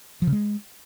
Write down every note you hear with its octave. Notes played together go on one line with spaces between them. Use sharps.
F3
C#3
G#3